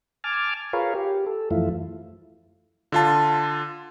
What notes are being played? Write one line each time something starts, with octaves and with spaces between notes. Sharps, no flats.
G#5 A5 D6 F6
F4 G#4 A#4 B4 C#5 F5
G4
A4
F#2 E3 F3 A3 E4 F4
D3 F4 A5